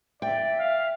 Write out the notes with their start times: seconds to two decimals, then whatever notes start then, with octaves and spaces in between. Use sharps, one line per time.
0.22 D5 E5 G5
0.59 F5